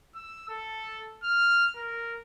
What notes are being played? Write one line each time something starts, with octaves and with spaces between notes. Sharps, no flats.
E6
A4
F6
A#4